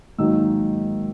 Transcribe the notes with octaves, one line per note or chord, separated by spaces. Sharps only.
G#2 D#3 F#3 A#3 E6